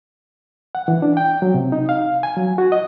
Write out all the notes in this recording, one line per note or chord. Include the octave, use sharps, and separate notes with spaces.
F#5
E3
D4
G5
F#3
C3
D#4
F5
G#5
F#3
F#4
D#5